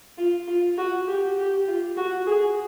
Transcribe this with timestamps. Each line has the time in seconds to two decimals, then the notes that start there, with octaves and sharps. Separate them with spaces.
0.18 F4
0.48 F4
0.77 F#4
1.07 G4
1.37 G4
1.67 F4
1.97 F#4
2.26 G#4